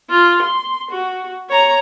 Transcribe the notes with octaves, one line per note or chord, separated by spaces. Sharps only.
F4
C6
F#4
C#5 A#5